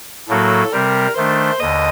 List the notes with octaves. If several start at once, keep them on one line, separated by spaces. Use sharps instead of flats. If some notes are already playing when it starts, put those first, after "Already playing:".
A2 F#3 A#3 F#4 A4
C3 G3 C4 A#4
D#3 A3 D4 C5
D#2 D3 D#5